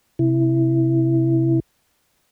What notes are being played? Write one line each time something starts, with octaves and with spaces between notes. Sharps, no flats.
C3 E4